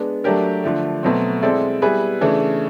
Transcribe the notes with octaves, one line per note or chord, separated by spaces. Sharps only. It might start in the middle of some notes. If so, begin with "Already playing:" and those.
Already playing: G#3 B3 D4
F#3 A3 D4 G4 A#4
D3 F3 A3
B2 F#3 A3 C4
G#3 C4 E4 A4 D5
G3 B3 E4 G#4 B4
C#3 E3 A3 D4